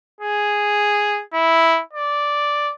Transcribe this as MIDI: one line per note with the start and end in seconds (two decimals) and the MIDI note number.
0.21 1.22 68
1.34 1.81 64
1.94 2.73 74